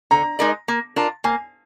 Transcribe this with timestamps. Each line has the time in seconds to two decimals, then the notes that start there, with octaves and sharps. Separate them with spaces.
0.11 D3 A#5
0.39 G#3 D#4 A#4 D5
0.68 A#3
0.96 D4 F4 A#4
1.24 A#3 G#5